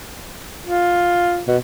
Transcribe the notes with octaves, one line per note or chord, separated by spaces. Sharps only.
F4
B2